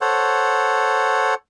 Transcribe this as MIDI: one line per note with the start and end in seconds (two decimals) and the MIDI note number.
0.01 1.34 69
0.01 1.34 72
0.01 1.34 73
0.01 1.34 78